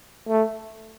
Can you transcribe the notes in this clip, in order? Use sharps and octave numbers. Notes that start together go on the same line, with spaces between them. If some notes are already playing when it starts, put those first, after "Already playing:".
A3